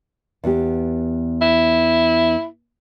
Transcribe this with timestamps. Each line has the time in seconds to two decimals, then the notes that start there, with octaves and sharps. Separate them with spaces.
0.44 E2 B3 G4
1.42 E4